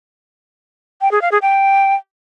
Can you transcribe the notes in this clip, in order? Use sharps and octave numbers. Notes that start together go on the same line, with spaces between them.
G5
G#4
F5
G#4
G5